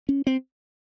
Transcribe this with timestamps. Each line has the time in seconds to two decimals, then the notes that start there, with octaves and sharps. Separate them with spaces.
0.09 C#4
0.27 C4